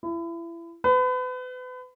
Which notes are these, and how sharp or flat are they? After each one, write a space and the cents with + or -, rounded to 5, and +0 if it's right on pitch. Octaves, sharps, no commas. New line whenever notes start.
E4 +30
B4 +35